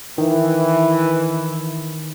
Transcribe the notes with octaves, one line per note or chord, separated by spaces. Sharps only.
D#3 E3